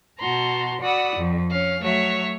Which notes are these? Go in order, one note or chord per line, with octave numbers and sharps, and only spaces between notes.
B2 F#4 A5 A#5 C6
F#4 D5 F#5 B5 D#6 E6
F2
C#4 F5
F#3 A3 F#4 C#5 E5